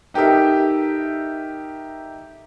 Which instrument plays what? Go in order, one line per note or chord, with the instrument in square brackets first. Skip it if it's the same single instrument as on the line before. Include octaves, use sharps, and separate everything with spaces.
[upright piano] D#4 G4 A4 A#4 E5